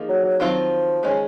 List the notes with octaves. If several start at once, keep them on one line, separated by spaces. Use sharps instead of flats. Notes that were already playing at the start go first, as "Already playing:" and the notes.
Already playing: F3 A#3 D#4 G#4
F#3
F#3
D#3 F3 F#3 C4 F4
D#3 G#3 C#4 G#4